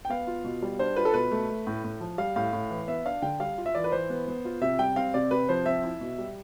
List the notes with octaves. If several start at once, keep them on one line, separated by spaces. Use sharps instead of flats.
G5
B3 F5
F4
B2
G3
D4 C5
F4 B4
A4
B2 B4
A3
A3
A2
A2
F3
G3 F5
A2 F5
A2
E3
B3 E5
D4 F5
D3 G5
G3 F5
F4
E5
E3 D5
B4
E3 C5
B3
B3
F4
C3 E5
G3 G5
C4 F5
C3 D5
C3 B4
F3 C5
C4 E5
E4
B2
G3